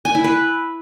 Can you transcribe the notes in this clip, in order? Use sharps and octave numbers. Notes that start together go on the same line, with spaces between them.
G#5
E4
B4